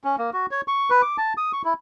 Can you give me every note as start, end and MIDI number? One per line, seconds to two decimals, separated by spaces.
0.04 0.16 61
0.18 0.30 58
0.33 0.46 66
0.51 0.61 73
0.68 0.90 85
0.90 1.02 71
1.02 1.17 86
1.18 1.33 81
1.37 1.52 87
1.53 1.62 85
1.64 1.74 64